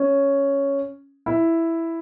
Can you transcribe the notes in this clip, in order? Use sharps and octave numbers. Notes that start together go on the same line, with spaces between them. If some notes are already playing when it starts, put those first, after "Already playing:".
Already playing: C#4
E4